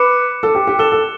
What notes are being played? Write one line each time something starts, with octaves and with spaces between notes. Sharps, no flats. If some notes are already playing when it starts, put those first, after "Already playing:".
Already playing: B4 D6 F#6 C#7
A4
G4
G4
A4 A6 E7 G7
A4